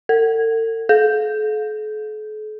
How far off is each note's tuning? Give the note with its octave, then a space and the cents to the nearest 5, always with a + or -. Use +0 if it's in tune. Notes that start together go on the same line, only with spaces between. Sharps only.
A4 +45
A4 -45